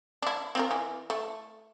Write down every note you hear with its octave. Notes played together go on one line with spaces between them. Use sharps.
D4 E4
C4 F4 A#4
E3
A3